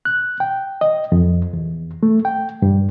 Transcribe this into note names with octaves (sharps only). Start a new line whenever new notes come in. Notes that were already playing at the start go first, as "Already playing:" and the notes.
F#6
G5
D#5
F2
E2
A3
G5
G2